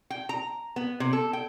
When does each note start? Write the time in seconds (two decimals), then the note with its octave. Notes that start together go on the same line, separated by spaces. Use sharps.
0.10 G5
0.29 A#5
0.76 B3
1.00 C3
1.13 A4
1.33 G5